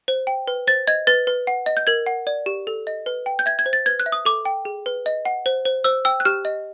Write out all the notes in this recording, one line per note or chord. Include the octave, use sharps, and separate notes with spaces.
C5
G5
B4
C5 A6
D#5 G#6
B4 A6
B4
F#5
D#5
G6
A#4 G#6
F#5
D5
G4
A4
D#5
B4
G5
G6
E5 G#6
G#6
C5
A6
B4 G#6
F#6
E5
D#6
A4 D6
G5
G#4
B4
D#5
F#5
C5
C5
C5 E6
G5 E6
F#6
G4 F6
D#5